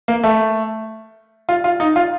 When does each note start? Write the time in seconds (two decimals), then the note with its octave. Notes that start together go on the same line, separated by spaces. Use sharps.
0.08 A#3
0.24 A3
1.49 F4
1.64 F4
1.80 D#4
1.96 F4